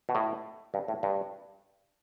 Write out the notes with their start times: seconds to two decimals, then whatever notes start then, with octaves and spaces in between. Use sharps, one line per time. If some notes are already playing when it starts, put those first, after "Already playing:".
0.09 B2
0.15 A2
0.74 G2
0.88 A2
1.03 G2